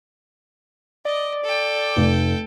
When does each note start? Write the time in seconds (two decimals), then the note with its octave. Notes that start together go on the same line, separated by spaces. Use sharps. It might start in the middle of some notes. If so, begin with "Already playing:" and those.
1.05 D5 D#5
1.44 A4 G5
1.96 F1